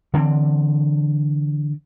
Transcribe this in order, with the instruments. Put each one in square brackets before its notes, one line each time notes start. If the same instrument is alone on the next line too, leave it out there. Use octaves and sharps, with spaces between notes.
[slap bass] D3 E3 A#3 C4